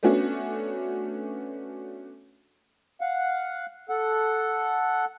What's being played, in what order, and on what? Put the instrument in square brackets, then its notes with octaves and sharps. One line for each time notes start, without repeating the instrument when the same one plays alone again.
[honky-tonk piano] A3 B3 C#4 D4 F#4
[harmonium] F5 F#5
A4 F#5